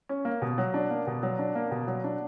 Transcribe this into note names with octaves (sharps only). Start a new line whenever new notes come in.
C#4
A#3
B2
F#3
D4
A#3
B2
F#3
D4
A#3
B2
F#3
D4